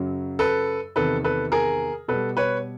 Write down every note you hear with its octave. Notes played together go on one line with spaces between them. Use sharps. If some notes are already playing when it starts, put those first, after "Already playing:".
Already playing: F#2 C#3 F#3
A4 B4
E2 C3 D#3 A4 B4
A4 B4
G#4 A#4
B2 G3 A4 B4
B4 C#5